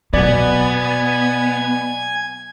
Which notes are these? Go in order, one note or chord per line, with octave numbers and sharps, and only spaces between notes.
B2 F#3 B3 D5 G#5 G#6